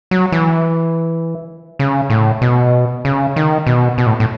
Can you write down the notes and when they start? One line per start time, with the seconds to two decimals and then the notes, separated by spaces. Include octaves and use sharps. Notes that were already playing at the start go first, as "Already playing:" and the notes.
0.11 F#3
0.32 E3
1.79 C#3
2.10 A2
2.41 B2
3.05 C#3
3.36 D#3
3.67 B2
3.98 B2
4.06 A2
4.20 A2